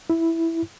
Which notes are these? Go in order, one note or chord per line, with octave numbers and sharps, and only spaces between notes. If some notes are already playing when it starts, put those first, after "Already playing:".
E4